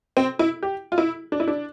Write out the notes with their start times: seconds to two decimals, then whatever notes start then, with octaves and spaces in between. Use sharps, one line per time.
0.17 C4
0.39 E4
0.63 G4
0.92 F4
0.98 E4
1.32 D4
1.40 E4
1.48 D4